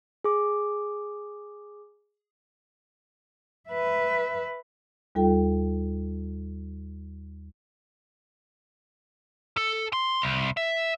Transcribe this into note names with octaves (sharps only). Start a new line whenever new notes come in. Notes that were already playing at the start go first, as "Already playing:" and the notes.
G#4 D6
B4 E5
D#2 G3 F4 A4 G5
A4
C6
C2
E5